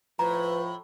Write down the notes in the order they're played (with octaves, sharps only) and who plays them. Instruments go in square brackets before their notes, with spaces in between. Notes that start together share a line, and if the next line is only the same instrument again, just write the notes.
[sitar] A2 [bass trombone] F3 [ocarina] B4 [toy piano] A#5